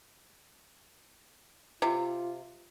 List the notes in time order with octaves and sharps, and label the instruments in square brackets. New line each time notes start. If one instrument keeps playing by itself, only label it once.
[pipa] C3 [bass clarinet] F4